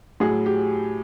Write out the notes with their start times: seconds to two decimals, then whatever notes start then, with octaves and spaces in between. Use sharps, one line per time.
0.20 A2 F#3 G#4
0.46 G4